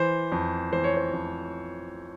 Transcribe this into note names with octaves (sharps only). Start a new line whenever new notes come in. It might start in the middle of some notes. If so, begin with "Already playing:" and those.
Already playing: E3 C5
F2
E3 C5
C#5
C5
F2